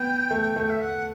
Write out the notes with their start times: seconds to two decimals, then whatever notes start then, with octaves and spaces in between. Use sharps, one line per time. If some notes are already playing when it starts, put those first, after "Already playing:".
Already playing: B3 G5
0.31 A3
0.56 A3
0.70 E5
0.81 F#5